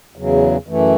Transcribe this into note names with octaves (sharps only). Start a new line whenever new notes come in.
E2 C#3 F#3
F#2 E3 A3